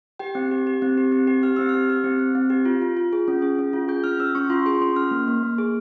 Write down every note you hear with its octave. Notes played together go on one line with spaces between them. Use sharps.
G4 G5
C4
G4
G4
C4
G4
C4
G4
G4 F6
C4 E6
F6
G4
G4
C4
C4
C4
G4
F4
F4
F4
G#4
C#4
G#4
C#4
F4
G#4 G6
C#4 F6
C#4 E6
C#4 C#6
F4 C6
G#4 C6
C#4 C6
C#4 F6
A#3
A#3
A#3
G#4